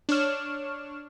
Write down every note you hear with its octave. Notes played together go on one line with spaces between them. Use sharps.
D4 C#5 C#6 F6 E7